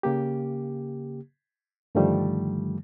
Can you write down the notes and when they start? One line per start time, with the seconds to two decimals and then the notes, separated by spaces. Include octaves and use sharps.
0.03 C#3 A#3 G4
1.95 G2 D3 D#3 F3 G3 A3